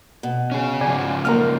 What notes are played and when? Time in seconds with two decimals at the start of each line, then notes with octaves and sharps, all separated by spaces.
0.23 B2
0.52 C#4 G#4
0.81 C#3 F3 D5 G#5
1.25 F#2 A#3 D#4 A#4 F6